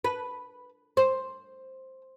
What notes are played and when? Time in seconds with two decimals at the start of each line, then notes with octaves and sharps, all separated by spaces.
0.04 B4
0.97 C5